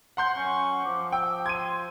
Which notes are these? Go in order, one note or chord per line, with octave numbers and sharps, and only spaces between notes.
F#5 C6 G6
F#2 C#4 C#6
F3 D6
G5 E6
C6 G#6 D#7